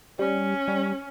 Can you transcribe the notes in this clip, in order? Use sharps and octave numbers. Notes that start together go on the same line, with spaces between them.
G3 C#4
G3